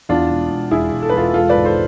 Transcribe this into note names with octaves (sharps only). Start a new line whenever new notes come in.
E2 D4 F4
E1
E1
E1 E4 G#4
E1
A4
B4
E1 F4 A4
G#3 F4 A4
B4 D5
G#1
A4 C5